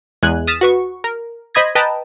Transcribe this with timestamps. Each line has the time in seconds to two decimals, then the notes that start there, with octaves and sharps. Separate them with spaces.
0.23 E2 G#3 G#5 F#6
0.47 D#6 F6 A6 B6 E7
0.61 F#4 B4 C#6
1.04 A#4
1.55 C5 D#5 B5 D#6 G#6 A#6
1.75 B4 D#5 G5 A5 A#5